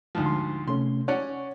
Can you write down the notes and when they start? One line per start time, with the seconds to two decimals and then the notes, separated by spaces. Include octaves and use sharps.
0.15 D2 G#2 F3
0.26 C6
0.68 C3 A3 C#4 C6
1.08 C#4 C#5 D5 F#5